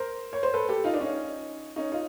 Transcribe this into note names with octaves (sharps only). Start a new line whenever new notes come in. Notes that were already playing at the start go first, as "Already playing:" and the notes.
Already playing: A#4 C5
C#5
C5
A4 B4
G4 A4
D#4 F4
D4
C#4 D#4
C#4 D#4
D#4 F4